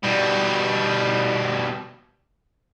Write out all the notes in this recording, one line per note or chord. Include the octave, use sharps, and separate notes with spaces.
B2 G3